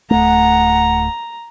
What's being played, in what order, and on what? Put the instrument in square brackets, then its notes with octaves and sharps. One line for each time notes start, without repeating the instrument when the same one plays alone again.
[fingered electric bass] D1 A3 [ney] F#5 [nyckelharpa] A#5